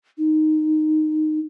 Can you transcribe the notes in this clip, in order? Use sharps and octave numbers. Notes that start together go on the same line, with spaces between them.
D#4